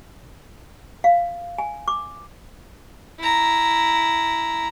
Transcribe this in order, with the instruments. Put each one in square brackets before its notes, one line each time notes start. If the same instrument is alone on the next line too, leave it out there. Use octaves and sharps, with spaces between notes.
[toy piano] F5
G#5
D6
[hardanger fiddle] E4 A#5